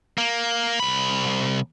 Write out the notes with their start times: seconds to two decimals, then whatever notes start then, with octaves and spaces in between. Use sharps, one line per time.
0.18 A#3
0.80 C2 B5